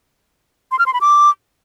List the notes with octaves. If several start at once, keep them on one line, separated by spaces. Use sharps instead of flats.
C6
F6
C6
B5
D6